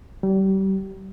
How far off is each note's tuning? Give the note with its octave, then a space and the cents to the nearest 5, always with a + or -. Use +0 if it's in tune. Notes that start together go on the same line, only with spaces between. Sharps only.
G3 -30